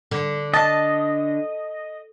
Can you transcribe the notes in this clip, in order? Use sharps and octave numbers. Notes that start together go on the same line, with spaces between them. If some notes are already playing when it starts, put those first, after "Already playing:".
D3
D#5 A5